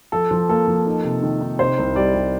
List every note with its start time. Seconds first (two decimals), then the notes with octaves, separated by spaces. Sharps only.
0.12 F3 A4
0.31 F3
0.49 A#3 A4
0.67 F3
0.86 D#4
1.04 C3
1.22 D#3
1.41 D#4
1.59 C3 C5
1.78 C2
1.96 G3 D5
2.14 G3